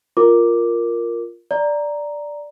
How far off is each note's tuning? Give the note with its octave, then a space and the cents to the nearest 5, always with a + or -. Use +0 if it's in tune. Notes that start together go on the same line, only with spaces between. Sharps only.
F4 +0 A#4 +0 D6 +5
D5 +0 A#5 +0